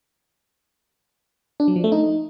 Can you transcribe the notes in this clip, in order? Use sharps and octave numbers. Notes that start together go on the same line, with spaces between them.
D4
F#3
F3
A3
D#4